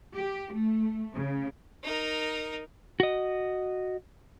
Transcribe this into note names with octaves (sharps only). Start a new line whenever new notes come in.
G4
A3
C#3
D#4 A#4
F#4 D#5